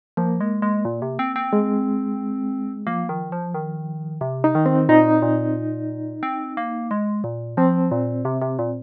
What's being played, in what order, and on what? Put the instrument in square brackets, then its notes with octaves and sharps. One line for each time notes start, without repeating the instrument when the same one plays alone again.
[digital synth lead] F3 [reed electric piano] A#3
[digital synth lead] G#3
G#3
A#2
C3
C4
C4
[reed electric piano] G#3
[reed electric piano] F3 [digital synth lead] A#3
[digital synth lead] D#3
F3
D#3
C3
[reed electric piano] D#4
[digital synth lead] D#3
[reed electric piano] C4
[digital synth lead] A#2 [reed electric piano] D#4
[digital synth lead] A#2
C4
A#3
G#3
A#2
[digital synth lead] F3 [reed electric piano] C4
[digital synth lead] A#2
C3
C3
A#2